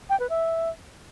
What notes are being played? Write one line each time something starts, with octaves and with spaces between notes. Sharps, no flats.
G5
B4
E5